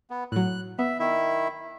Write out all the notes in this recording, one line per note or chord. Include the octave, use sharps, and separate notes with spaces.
B3
A2 F#3 F#6
B3 E5
D#3 E4 E5